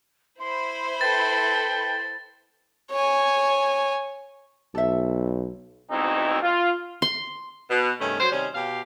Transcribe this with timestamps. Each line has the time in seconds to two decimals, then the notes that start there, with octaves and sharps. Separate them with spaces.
0.40 E4 C5 B5 C6
1.01 A4 B4 G5 A6
2.91 C#5 G#5
4.75 B1 A4 E5
5.91 D2 G#2 B2 C4 D#4 E4
6.43 F4
7.02 C6
7.70 B2
8.00 G2 C3 D#3 A3 C#4
8.20 F#3 C5
8.32 C3 D#3 G3 C#4
8.55 B2 G4 F5